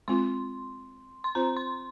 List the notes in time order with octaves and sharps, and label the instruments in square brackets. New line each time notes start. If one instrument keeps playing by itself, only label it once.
[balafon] G#3 C4 F4 [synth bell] C6
[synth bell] C6
[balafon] C4 F4 C5 [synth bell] A#5
[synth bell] C6